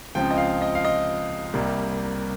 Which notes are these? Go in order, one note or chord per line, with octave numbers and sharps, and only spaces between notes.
C#2 C#3 F3 C4 G5
D#5
F5
D#5
F5
D#5
C2 C3 G3 A#3